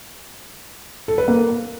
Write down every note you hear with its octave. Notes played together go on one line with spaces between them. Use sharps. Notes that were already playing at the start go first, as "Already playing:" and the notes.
A4
B4
A#3